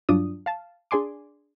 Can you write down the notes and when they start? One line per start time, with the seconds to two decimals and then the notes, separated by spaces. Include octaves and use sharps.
0.09 G2 F#3 D4 F4 D#6
0.46 F5 A5
0.91 D4 G#4 D5 G#5 C6 D6